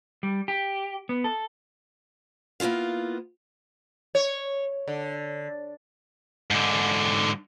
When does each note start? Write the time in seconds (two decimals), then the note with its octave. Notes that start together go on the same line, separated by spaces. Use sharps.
0.23 G3
0.48 G4
1.09 B3
1.24 A4
2.60 A#3 B3 E4 F4 F5
4.15 C#5
4.88 D3
6.51 G#2 D3